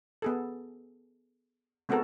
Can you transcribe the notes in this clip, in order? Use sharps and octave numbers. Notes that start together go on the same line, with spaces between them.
B3 G#4 A4
G#3 B3 C4 F#4 A4 A#4